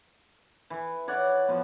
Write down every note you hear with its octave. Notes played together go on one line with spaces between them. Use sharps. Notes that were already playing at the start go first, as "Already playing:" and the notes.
E3
C#5 D5 F#5
F3 B3